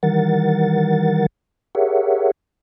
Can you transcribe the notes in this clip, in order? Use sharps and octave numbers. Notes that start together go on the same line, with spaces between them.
D#3 E3 G3 A#4 F#5 A6
G4 G#4 A#4 C#5 E5 F#5